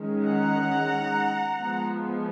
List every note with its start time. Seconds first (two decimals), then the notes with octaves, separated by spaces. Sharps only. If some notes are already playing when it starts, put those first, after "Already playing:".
Already playing: D#3 G#3 C#4
0.26 F#5 A#5
1.59 F3 G#3 B3